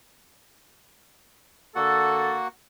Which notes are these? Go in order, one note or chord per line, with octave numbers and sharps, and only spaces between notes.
D3 A#3 F#4 A4 F#5